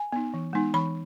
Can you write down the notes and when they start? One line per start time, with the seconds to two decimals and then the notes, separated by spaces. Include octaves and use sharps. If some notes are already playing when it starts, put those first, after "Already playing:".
Already playing: G#5
0.12 B3 D#4
0.34 E3
0.53 G#3 B3 D#4
0.74 E3 B5